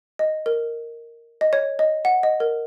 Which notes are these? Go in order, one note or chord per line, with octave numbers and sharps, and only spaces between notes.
D#5
A#4
D#5
C#5
D#5
F#5
D#5
A#4